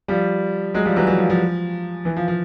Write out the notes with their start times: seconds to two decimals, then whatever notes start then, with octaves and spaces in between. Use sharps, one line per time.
0.08 F3 G3
0.74 F#3 G#3
0.85 F3 G3
0.96 E3 F#3
1.07 E3 F#3
1.18 F3
1.30 F3
2.05 E3
2.16 F3
2.28 F3